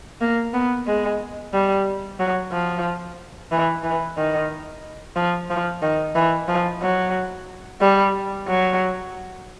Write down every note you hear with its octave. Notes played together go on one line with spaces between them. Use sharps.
A#3
B3
G#3
G3
F#3
F3
E3
E3
D#3
F3
F3
D#3
E3
F3
F#3
G3
F#3